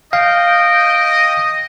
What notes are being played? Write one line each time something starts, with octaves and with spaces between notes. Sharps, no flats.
D#5 F5 G5